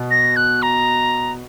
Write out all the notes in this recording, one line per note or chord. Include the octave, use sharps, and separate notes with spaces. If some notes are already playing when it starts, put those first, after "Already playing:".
Already playing: B2
A#6
F#6
A#5